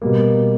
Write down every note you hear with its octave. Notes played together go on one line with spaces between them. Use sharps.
B2 G3 A#3